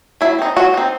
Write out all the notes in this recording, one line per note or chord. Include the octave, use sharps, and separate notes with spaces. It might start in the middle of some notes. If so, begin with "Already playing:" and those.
F#3 E4
C4 D#4
F#3 F#4
C4 D#4